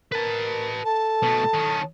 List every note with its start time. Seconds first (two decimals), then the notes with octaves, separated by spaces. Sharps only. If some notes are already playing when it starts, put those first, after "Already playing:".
0.12 A#4 B4 A5
0.85 A4 A5
1.23 B2 A3
1.54 D#3 C#4